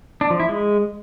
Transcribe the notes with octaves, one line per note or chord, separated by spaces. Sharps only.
D4
F3
E4
G#3